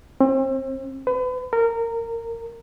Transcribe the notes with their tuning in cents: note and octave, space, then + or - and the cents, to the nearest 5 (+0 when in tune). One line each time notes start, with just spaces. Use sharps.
C4 +35
B4 +35
A#4 -20